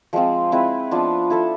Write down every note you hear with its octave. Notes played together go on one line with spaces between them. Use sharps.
F3 G#3 C4 F4
G#3 C4 E4 B4
F3 B3 D4 F4
E4 A4 E5